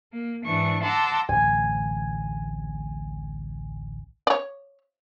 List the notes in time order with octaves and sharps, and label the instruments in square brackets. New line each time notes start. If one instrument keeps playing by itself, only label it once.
[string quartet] A#3
G#2 E3 D4 C#6
F#5 A5 A#5 C6 D6 E6
[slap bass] D1 A1 [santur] G#5
[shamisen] C#5 D5